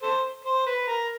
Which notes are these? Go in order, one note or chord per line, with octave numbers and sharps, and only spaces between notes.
A4 C5
C5
B4
A#4